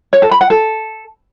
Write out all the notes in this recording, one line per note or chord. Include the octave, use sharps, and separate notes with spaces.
C#5
A4
B5
F#5
A4